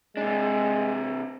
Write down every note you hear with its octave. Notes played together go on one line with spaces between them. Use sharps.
C3 G#3 D4